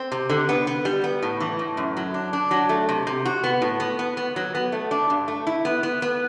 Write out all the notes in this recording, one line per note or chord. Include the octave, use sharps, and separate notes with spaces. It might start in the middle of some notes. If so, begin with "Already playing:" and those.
Already playing: C4
C3
D3
B3
B3
G3
B3
A2
E3
A2
F#2
F#3
D4
D4
F#3
A3
C3
C3
F#4
B3
A2
B3
B3
B3
F#3
B3
A3
D4
G2
A3
E4
B3
B3
B3